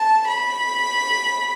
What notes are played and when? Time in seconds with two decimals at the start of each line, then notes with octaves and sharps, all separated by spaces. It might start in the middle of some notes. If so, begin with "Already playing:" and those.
Already playing: A5
0.26 B5